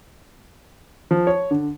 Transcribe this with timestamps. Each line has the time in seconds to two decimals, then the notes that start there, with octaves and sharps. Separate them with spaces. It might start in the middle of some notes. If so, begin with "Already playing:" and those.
1.11 F3
1.27 C#5
1.51 D3